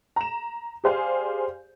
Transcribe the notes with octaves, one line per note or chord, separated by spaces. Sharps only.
A#5 E7
G4 G#4 C5 D5 F5 G#5